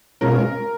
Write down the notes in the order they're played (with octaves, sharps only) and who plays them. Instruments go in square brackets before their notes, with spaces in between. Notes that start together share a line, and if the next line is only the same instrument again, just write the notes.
[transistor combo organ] B2 G#3 C#4 F4 [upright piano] A#4